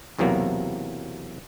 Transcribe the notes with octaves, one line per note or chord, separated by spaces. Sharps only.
B1 E2 C3 F#3 A#3